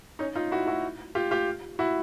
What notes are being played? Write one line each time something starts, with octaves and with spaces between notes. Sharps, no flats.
C#4 D#4
D#4 F4
E4 F#4
E4 F#4
F4 G4
F4 G4
E4 F#4